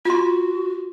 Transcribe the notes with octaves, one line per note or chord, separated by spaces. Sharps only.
F4 F#4 C6